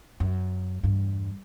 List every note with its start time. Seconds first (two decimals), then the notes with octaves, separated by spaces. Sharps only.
0.20 F#2
0.83 E2 G2